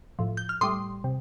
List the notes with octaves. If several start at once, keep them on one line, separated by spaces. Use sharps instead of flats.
A2 F3
G6
F6
A2 G3 C6 D#6
C3